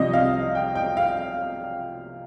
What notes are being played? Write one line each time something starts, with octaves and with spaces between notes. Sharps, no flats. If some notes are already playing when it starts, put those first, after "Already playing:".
Already playing: C2 C3 F3 C4 D#5
F5
G5
G5
F5